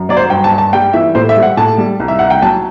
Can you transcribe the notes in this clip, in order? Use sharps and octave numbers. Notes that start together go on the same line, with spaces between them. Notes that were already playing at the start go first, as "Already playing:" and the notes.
Already playing: F#2
F#3 D5
C5
G2 G5
A5
G2
A5
G3 G5
E3 E5
A2 C5
E5
G3
F#5
A2 A5
G3
C2
E5
C2 F#5
G5
F#3 A5